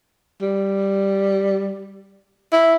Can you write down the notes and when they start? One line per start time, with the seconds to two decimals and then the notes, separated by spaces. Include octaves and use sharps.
0.42 G3
2.52 E4